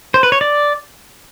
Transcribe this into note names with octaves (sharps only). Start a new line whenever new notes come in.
C5
B4
C#5
D5